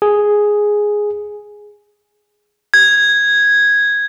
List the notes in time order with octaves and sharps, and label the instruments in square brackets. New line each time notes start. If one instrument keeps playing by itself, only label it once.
[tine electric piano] G#4
[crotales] G#6